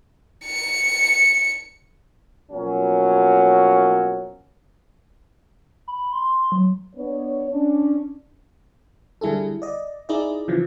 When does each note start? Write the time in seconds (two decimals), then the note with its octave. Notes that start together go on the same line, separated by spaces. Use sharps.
0.46 C#7
2.51 B2 F3 F#3 A#3 C#4
5.88 B5
6.13 C6
6.52 F#3
6.96 B3 D4 C#5
7.49 C#4 D4
9.21 D3 G3 E4 G#4 A4
9.62 D5 D#5
10.09 D#4 E4 G#4 D5 D#5
10.48 C#3 E3 F3